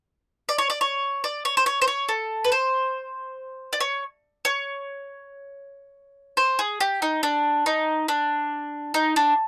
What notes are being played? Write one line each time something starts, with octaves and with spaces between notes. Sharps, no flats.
D5
C#5
D5
C#5
D5
C#5
C5
C#5
C5
C#5
A4
B4
C5
D5
C#5
C#5
C5
G#4
G4
D#4
D4
D#4
D4
D#4
D4